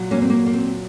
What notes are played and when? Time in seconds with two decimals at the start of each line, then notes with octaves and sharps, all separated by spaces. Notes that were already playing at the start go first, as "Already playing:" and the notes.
Already playing: A#2 F#3
0.11 A#3 C#4
0.22 C4
0.30 A#3
0.46 A#3
0.54 C4